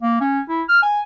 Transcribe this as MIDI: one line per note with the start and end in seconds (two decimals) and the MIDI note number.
0.02 0.21 58
0.21 0.41 61
0.49 0.62 64
0.68 0.80 89
0.83 1.01 80